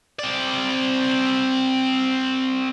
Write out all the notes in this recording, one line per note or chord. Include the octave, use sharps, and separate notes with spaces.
C4 D5